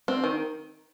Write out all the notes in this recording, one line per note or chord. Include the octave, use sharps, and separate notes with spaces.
C4
D#3